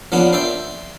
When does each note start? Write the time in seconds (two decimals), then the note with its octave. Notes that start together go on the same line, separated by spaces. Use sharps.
0.12 F3 A#3 B3 C#4 D4
0.33 C5 D5 E5 G5